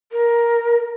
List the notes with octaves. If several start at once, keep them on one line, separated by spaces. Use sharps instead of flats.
A#4